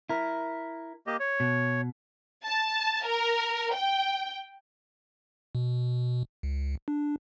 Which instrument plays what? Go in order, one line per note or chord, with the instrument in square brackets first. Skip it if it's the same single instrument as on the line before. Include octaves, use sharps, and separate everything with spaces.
[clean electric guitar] E4 A#4
[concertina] A#3 G4 D#5
C#5
[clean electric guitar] B2
[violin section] A5
A#4
G5
[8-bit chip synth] B2
C#2
D4